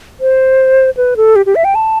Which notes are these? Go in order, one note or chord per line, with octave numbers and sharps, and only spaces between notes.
C5
B4
A4
G4
G4
E5
G5
A5